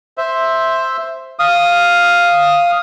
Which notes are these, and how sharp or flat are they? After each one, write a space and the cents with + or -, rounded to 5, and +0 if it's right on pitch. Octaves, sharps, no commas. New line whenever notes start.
C5 +5 E5 +0
F5 +0 D#6 +0